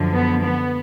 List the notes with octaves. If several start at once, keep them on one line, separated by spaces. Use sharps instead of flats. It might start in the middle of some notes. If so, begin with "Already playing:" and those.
Already playing: F#2 D3 F3
B3
B3